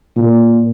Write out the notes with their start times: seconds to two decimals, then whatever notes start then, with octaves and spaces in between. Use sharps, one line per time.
0.17 A#2